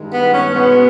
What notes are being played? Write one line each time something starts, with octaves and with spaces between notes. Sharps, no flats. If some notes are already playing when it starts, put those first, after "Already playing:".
Already playing: G2 D#3 G#3
B3
C#4
B2 G#3 B3